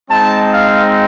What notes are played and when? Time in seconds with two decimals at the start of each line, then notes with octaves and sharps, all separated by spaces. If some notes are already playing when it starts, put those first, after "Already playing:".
0.11 G#3 C4 D#4 A5
0.52 F5